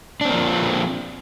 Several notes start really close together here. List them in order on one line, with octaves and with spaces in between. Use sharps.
D4 C4 A#3 F3